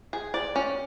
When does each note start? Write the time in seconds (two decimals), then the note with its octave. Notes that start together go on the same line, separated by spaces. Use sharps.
0.13 G#4
0.34 D5
0.56 C#4